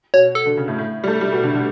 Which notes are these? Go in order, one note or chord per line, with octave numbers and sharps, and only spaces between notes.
B2 C#5
A4
D3
C#3
A2
A2
G3
A3
G3
B2
D3
D3